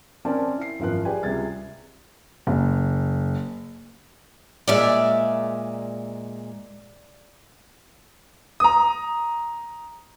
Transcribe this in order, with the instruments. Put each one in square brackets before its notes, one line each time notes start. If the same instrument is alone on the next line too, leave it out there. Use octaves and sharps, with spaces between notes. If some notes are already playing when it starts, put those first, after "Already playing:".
[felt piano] C4 C#4 A#4 D5 A5
E4 C7
G#1 F#2 F3 A#4 B4 F#6
G4 G#4 B4 D5 G5 G#5
C#2 C3 G3 G#4 G#6 A6
F#1
[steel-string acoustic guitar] A#2 G#3 [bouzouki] D5 E5 F5
[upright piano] A#5 D#6